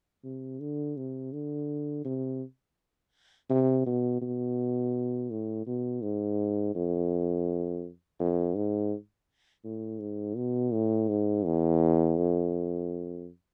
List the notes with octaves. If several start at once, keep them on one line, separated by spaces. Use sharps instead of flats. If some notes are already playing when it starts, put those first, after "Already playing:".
C3
D3
C3
D3
C3
C3
B2
B2
A2
B2
G#2
F2
F2
G#2
A2
G#2
B2
A2
G#2
E2
F2